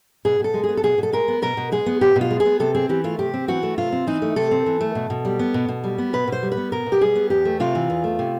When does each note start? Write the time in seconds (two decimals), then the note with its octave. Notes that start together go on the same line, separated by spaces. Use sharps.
0.25 B2 G#4
0.40 B2 A4
0.54 G#3
0.64 G#4
0.69 B3
0.77 A4
0.83 B2 G#4
0.98 B2 A4
1.13 G#3 A#4
1.28 B3
1.42 B2 A#4
1.57 B2
1.72 G#3 G#4
1.86 B3
2.01 B2 G4
2.16 B2
2.21 F4
2.31 G#3
2.40 G#4
2.45 B3
2.60 C3 A4
2.74 C4 G#4
2.89 E3 G4
3.04 A3 F4
3.19 C3 G4
3.34 C4
3.48 E3 F#4
3.63 A3
3.78 C3 F4
3.92 C4
4.07 E3 D#4
4.22 A3
4.36 C3 A4
4.51 C4
4.66 E3
4.81 A3
4.95 B2
5.10 B2
5.25 G3
5.39 B3
5.54 B2
5.69 B2
5.84 G3
5.98 B3
6.13 B2 B4
6.28 B2 C5
6.43 G3
6.52 B4
6.57 B3
6.72 B2 A#4
6.86 B2
6.92 G4
7.01 G3 G#4
7.16 B3
7.30 E2 G4
7.45 A3
7.60 C3 F4
7.75 E3
7.90 E2
8.04 A3
8.19 C3